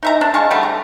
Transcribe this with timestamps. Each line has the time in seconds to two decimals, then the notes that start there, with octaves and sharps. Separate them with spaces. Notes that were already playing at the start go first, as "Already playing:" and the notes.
0.03 D#4 E5 A#5
0.21 D4
0.34 G#3 F5 A5 C#6
0.50 D3 G3 A3
0.63 A#5